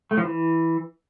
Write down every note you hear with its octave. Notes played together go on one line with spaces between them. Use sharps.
A3
F3
E3